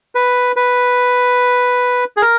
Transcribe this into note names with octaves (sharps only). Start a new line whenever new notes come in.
B4
B4
G#4
A#4